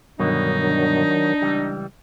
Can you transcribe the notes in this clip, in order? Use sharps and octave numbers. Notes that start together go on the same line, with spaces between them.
G2 B2 D3 D#3 F#3 D4 D#4
D4
C#2 E3 G3